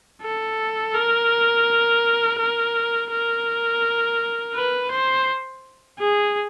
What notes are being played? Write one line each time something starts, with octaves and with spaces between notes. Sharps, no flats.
A4
A#4
A#4
A#4
B4
C5
G#4